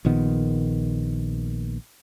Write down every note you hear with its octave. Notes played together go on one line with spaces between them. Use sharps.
A#1 A#2 D#3 B3